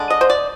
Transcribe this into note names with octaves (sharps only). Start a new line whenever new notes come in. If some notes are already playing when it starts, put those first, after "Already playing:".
Already playing: D3 G#3 D4
D#5
C5
D5